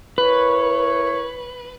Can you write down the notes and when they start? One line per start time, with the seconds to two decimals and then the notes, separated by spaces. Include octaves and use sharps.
0.18 E4 A#4 B4 C#5